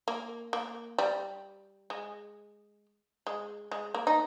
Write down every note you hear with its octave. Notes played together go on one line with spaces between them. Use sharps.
A#3
A#3
G3
G#3
G#3
G#3
A#3
D#4